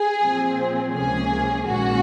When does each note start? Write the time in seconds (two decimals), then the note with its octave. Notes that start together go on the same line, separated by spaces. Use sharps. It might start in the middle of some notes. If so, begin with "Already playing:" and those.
Already playing: G#4
0.22 A#2 F3 C4
0.95 C#2 C3 F3 A#3 C#4 G#4
1.68 A#1 G#2 D#3 A#3 C#4 F#4